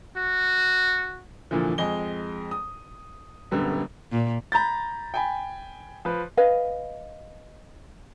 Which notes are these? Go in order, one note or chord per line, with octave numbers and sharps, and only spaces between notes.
F#4
A#2 D3 E3 F3
F2 G#3 D#5 G#5 G7
D#6
D#1 F#2 D3 G3 B3
A#2
A#5 B5 G6 A6
G5 G#5 B5
F3 B4
B4 D#5 F5